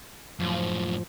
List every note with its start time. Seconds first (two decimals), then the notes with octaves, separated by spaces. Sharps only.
0.40 F#2 A2 F3